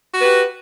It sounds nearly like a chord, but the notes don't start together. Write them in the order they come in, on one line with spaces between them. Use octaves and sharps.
F#4 B4 G4